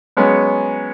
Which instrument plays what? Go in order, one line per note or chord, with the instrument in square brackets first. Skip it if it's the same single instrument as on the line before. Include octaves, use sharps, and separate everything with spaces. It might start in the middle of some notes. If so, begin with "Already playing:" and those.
[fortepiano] F#3 G#3 B3 C#4